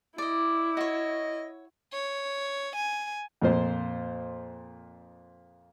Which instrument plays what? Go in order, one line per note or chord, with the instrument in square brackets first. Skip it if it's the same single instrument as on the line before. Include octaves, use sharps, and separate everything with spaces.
[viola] E4 [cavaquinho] D5 D#5
[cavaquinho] F#4 C#5 [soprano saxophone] D#5
[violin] C#5
G#5
[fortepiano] F2 A#2 C5